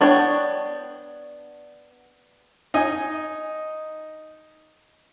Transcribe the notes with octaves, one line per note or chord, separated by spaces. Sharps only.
B3 D4 C#5 F#5 G5
D#4 D#5 G#5